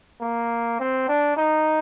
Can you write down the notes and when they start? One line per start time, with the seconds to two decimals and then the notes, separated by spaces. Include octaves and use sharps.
0.21 A#3
0.80 C4
1.08 D4
1.37 D#4